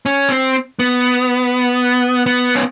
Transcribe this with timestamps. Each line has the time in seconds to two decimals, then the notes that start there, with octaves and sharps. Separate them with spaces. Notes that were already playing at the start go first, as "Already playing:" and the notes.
0.06 C#4
0.30 C4
0.79 B3
2.26 B3
2.55 C#4